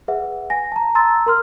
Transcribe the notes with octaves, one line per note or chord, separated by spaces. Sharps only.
G#4 B4 E5 F#5
G#5 A#6
A5 A#5
A5 A#5 C6 E6 A6
A#4 C6 F6